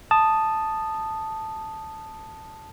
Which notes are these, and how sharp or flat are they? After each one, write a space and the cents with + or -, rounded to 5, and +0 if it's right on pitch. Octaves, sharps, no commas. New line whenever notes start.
A5 +0 D#6 -10